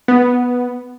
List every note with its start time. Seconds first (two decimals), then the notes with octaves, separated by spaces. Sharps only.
0.08 B3